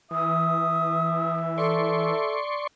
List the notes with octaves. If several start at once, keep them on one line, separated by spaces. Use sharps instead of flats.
E3 E5 D#6
A4 D5 C6 C#6